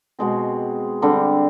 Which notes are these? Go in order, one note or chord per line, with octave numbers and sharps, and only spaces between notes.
B2 G#3 C4
D3 G3 C4